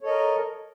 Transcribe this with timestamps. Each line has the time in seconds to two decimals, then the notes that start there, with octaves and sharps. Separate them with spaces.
0.01 C#5
0.03 A4
0.06 D#5
0.09 A#4